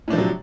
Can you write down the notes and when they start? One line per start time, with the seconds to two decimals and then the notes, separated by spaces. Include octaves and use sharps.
0.08 A2
0.10 D4
0.13 F3
0.16 C3
0.18 F#3